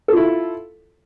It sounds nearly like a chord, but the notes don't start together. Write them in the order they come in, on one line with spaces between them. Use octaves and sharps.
A4 F4 E4